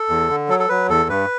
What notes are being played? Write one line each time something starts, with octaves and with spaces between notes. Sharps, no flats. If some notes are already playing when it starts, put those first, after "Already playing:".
Already playing: A4
E2
D3
F#3 A4
A4
F#3 B4
E2 A4
G2 B4